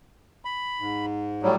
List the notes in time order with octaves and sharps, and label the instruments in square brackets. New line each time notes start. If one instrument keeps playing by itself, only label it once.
[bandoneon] B5
[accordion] G#2
[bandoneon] A2 F#3 G3